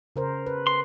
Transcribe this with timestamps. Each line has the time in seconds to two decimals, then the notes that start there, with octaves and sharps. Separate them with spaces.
0.16 C#3 A#4 C5
0.47 B4
0.67 C6